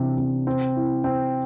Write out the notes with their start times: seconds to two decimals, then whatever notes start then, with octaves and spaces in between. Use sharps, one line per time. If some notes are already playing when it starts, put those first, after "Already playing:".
Already playing: C3 E3 D4
0.18 C3
0.47 C4
0.76 E4
1.04 C4